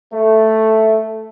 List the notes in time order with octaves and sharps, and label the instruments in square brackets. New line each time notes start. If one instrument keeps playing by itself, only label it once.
[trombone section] A3